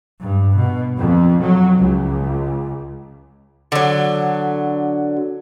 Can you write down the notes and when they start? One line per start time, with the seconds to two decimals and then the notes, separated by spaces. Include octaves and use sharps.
0.21 G2
0.55 B2
0.97 F2
1.42 F#3
1.78 C#2
3.72 D3 F#3